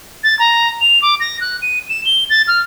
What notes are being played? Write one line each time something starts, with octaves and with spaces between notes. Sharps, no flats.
A6
A#5
F7
D6
A#6
F#6
D#7
E7
G7
A6
F6